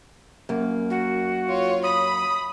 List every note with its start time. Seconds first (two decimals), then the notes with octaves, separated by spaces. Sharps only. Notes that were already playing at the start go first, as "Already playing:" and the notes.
0.49 F#2 A#3
0.90 F#4
1.46 F4 C#5
1.84 B5 D#6